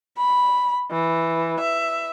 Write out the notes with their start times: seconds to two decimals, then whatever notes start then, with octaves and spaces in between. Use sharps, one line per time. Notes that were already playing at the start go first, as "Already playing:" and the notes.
0.18 B5
0.91 E3
1.60 E5